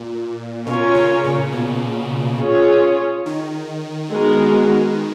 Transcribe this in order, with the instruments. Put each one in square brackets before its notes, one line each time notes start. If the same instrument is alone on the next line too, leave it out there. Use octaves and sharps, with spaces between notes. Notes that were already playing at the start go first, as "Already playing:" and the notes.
Already playing: [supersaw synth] A#2
[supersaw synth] B2 [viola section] C#4 F4 A#4 C#5
[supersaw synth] C#3
A#2
B2
[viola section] C#4 F4 G#4 C#5
[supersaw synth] D#3
[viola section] G#3 B3 F#4 A#4